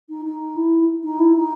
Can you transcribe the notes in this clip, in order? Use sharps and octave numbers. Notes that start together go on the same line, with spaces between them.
D#4
D#4
E4
D#4
E4
D#4